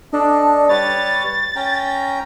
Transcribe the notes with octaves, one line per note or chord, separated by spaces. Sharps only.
D4 A4 D#5
G3 B4 C#5 A6
C#4 G5 A#5